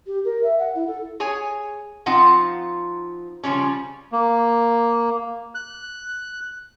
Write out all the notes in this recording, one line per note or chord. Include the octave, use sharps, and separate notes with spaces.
G4
A#4
E5
F#5
E4
A4
G#4 C#5 G#5
F3 C4 D#4 F4 F5 F#5
C#3 F3 G3 C#4
A#3
F#6